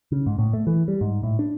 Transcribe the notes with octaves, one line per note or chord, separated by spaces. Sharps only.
C#3
G#2
A2
A3
E3
G3
G#2
A2
D4